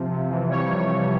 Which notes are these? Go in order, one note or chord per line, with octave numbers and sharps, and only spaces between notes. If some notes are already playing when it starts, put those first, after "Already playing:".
Already playing: C3 F3
C3
E3
G3 C#5
C3
C3